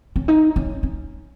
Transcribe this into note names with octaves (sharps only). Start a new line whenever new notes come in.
C#4
D#4
C#4
C#4